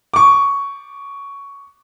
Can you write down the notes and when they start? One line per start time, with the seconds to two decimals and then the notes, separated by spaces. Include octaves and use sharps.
0.14 C#6 D6